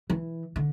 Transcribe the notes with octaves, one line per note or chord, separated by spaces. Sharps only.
E3
D3